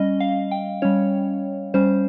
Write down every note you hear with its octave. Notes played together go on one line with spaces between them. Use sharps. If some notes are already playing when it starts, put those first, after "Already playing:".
Already playing: G3 C#4 D#5
F5
G5
G3 C#4 C#5
G3 C#4 C5